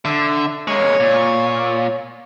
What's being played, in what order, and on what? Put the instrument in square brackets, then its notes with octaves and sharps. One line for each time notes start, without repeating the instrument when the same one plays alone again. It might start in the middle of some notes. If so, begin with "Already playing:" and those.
[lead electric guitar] D3 [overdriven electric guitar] E5
[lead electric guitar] G#3 A#3 [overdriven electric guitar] C#5
[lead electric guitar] A#2